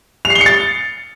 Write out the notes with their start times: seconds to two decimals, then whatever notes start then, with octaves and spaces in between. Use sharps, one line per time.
0.25 F7
0.30 C7
0.35 G7
0.41 C#7
0.46 A6